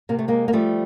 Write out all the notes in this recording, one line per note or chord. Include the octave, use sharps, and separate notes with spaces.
C3 A#3
A3
G#3 A#3
A#3
F3 G3 A3